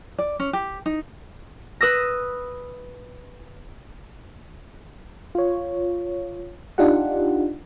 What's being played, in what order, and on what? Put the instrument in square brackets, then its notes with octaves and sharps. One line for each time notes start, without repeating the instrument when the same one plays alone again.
[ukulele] D5
C#4
G4
D#4
[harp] B4 D#6 E6 A#6
[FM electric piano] F4 C#5
D4 D#4 F4 G4 F#5